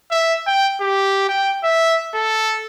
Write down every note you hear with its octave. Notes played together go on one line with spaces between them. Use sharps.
E5
G5
G4
G5
E5
A4